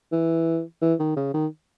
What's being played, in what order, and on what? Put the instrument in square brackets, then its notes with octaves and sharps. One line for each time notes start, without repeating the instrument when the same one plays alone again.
[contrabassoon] E3
E3
D#3
C#3
D#3